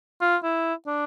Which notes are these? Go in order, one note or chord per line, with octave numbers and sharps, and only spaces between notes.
F4
E4
D4